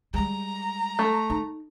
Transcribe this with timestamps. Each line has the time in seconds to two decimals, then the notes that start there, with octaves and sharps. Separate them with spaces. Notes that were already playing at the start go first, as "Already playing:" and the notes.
0.14 G3 G#3 A#5
0.99 A3
1.30 D#4